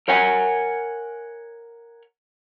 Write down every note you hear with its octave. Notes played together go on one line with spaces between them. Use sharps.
A#4 C#5 F#5 G#5